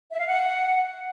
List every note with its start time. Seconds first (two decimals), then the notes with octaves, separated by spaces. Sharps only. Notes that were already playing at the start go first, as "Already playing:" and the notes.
0.12 E5
0.19 F5
0.26 F#5